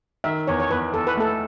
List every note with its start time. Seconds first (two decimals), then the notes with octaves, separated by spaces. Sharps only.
0.24 D#3 E5
0.47 E2 C#5
0.60 C#5
0.71 E2 B4
0.93 E2 A4
1.07 B4
1.17 A3 A4